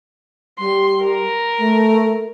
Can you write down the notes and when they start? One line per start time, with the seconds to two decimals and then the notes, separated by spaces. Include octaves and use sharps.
0.59 G3 C6
1.04 A#4
1.59 A3